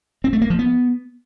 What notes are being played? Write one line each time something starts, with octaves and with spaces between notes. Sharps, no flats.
C4
A3
A#3
F3
B3